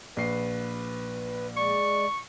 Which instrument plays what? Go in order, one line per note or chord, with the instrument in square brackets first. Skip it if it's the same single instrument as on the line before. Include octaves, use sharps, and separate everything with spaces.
[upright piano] A#1 C7 [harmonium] B4
[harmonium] G#3 D5 [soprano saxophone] C#6